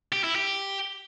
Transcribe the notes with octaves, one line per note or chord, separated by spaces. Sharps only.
G4
E4
G4